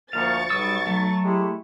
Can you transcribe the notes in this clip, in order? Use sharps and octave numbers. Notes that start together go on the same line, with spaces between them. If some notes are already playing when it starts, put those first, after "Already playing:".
D2 F3 A#3 F5 C#6 A6
B1 G3 D#6 E6
F#3 A3
G#3 E4 G4